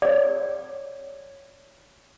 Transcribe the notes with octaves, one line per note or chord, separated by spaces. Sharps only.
C#5 D5